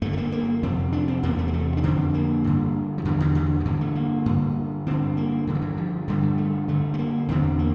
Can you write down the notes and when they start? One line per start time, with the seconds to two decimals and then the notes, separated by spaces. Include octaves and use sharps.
0.02 G2 A3
0.05 D3
0.13 A3
0.18 A#3
0.32 A#3
0.63 F2 C3 C4
0.93 D4
1.08 C4
1.23 E2 C3 A#3
1.38 A3
1.48 A#3
1.53 A3
1.77 D4
1.84 F2 D3 C4
2.14 A#3
2.44 G2 D3
2.98 F3
3.05 E2 D3 E3
3.20 D3
3.35 D3
3.60 F3
3.65 G2 D3 E3
3.81 A3
3.95 A#3
4.26 G2 D3
4.86 G2 D3 C4
5.17 A#3
5.47 G2 D3 E3
5.55 F3
5.62 E3
5.77 F3
6.08 G2 D3 G3
6.22 G3
6.38 A3
6.68 G2 D3 A3
6.94 A3
6.99 A#3
7.29 E2 D3 C4
7.59 A#3